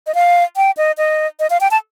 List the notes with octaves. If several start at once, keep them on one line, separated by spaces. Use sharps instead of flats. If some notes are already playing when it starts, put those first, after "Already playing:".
D#5
F5
G5
D#5
D#5
D#5
F5
G5
A5